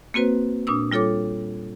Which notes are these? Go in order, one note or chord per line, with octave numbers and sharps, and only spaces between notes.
A#3 C4 F#4 B4 C5
A#2 D4 D#6 E6
G3 F4 A4 C#5 D6